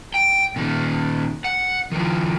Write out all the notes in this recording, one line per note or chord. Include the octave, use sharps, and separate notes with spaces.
G5
A#2 D#3
F#5
D#3 F3